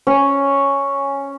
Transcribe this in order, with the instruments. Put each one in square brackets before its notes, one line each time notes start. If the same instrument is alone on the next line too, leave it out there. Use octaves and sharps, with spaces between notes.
[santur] C#4